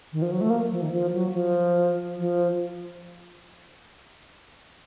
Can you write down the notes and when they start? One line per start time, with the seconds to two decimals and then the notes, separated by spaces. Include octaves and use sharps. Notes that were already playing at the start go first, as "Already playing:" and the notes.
0.13 D#3
0.22 F3
0.32 F#3
0.41 A3
0.50 A#3
0.71 F3
0.82 D#3
0.92 F3
1.13 F#3
1.34 F3
2.18 F3